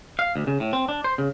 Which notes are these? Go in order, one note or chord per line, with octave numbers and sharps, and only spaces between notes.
F5
D2
C#3
A2
C4
D4
C5
C#3